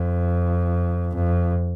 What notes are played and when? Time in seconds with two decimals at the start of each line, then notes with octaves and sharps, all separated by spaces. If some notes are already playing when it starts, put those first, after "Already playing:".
Already playing: F2
1.15 F2